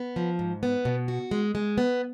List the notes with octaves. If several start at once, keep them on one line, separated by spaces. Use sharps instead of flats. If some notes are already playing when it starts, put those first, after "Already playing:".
Already playing: B3
F3
G#2
B3
B2
F#4
G#3
G#3
B3